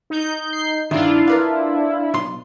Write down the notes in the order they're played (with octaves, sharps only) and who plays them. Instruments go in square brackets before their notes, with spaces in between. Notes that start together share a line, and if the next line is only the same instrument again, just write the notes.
[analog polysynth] D#4 G6
[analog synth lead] C7
[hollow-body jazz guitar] G2 D#3 [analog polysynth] D4 F4 [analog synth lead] E4
[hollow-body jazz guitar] A#4 B4 F5
B1 F4 C6